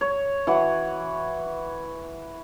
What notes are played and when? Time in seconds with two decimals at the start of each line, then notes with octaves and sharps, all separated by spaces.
0.01 C#5
0.47 E3 F#4 F#5